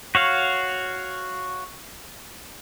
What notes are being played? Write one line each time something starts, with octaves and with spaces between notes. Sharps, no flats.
F#4 C#5 F5